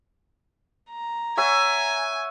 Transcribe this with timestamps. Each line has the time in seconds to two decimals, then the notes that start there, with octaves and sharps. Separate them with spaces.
0.90 A#5
1.37 C#5 E5 F#5 G#5